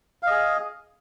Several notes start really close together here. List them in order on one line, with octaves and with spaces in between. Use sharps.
F5 D#5 G#4